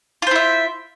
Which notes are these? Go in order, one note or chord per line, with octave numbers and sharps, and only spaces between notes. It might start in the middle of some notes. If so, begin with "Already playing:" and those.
E4 F4 C5 E5